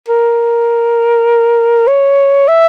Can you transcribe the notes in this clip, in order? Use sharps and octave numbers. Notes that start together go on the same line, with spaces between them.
A#4
C#5
E5